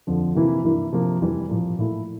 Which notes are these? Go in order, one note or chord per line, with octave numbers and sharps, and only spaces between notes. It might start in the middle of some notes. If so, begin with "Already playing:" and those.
F2 D3 F3
C3 E3 A#3 E4
G2 E3 A#3 E4
C3 F3 A#3
F2 E3 G3 D4
A#2 F3 A#3
A#2 A3 E4